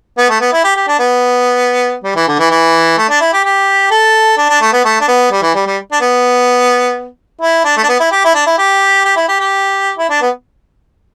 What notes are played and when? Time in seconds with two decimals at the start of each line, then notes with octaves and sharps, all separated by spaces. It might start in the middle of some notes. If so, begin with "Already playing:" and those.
0.18 B3
0.29 A3
0.41 B3
0.53 E4
0.64 G4
0.76 G4
0.88 D4
0.99 B3
2.04 G3
2.16 E3
2.28 D3
2.39 E3
2.51 E3
2.98 A3
3.09 D4
3.21 E4
3.33 G4
3.44 G4
3.91 A4
4.37 D4
4.50 D4
4.61 A3
4.73 B3
4.85 A3
5.01 D4
5.08 B3
5.31 G3
5.42 E3
5.55 G3
5.67 G3
5.92 D4
6.01 B3
7.41 E4
7.65 D4
7.77 A3
7.83 D4
7.89 B3
8.00 E4
8.11 G4
8.25 E4
8.35 D4
8.46 E4
8.58 G4
9.05 G4
9.17 E4
9.28 G4
9.40 G4
9.98 E4
10.10 D4
10.22 B3